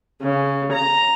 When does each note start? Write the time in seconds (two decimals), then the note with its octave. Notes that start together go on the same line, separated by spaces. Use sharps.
0.22 C#3
0.73 A#5